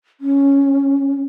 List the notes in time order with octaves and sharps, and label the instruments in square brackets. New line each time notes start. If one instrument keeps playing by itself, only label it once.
[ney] C#4